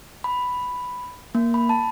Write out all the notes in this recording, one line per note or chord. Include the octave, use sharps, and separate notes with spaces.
B5
A#3
B5
A5